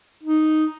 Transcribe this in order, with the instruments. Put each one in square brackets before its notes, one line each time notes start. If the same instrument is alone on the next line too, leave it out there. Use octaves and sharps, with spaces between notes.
[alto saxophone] D#4